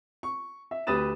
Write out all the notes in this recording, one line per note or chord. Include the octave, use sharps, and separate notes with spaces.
C#6
E5
D2 G4 B4 D#6 A6 E7